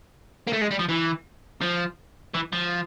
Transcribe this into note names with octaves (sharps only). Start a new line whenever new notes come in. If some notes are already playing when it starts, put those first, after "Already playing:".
A#3
A3
G#3
G3
F3
E3
F3
E3
F3